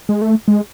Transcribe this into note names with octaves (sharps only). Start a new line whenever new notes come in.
G#3
A3
G#3